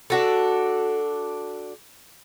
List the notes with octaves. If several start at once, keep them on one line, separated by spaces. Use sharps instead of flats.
D4 F#4 A4